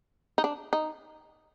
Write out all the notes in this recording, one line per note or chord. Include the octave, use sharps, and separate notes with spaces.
D#4
D4
D#4